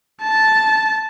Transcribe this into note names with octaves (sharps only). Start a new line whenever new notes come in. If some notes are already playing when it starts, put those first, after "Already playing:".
A5